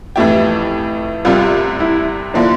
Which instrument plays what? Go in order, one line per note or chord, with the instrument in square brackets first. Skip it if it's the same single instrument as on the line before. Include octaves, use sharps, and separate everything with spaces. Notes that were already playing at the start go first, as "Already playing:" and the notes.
[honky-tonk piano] F2 E3 A3 E4 G4
[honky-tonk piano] C2 C3 G3 [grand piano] F4
[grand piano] E4
[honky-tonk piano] D3 F3 A#3 E4 [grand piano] D4